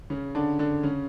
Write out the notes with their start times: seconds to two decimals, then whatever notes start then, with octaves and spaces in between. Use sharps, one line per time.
0.10 C#3 C#4
0.35 D3 D4
0.59 D3 D4
0.83 C#3 C#4